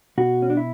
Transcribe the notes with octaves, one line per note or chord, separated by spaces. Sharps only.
B2 F#4
C#4
D4
E4